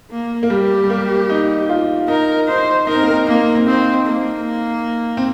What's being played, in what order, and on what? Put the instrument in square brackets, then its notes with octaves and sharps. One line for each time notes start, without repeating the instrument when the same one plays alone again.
[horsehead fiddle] A#3
[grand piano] A#3
[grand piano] G3 [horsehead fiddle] G4
[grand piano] G3
A#3
D#4
F4
[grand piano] D#4 [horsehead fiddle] A#4
[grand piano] D#4 [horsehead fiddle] C5
[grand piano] D#4 [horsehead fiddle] A#4
[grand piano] C4
A#3
C4
[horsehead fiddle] A#3 [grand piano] C4
[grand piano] C4
[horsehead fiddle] C4 [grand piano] D#4
[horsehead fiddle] A#3
[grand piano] C4